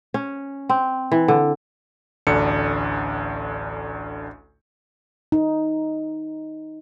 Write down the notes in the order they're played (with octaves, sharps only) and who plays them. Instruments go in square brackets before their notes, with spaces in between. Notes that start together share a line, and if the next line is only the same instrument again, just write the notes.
[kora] C#4
C4
E3
D3
[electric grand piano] A1 D2 D4 A4 C#7
[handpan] D#4